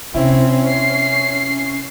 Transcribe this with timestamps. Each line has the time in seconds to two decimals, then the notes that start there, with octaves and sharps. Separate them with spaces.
0.14 C3 C4 C#4 E4
0.68 C7